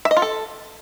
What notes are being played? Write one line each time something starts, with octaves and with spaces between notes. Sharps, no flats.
E5
D#5
F4
A4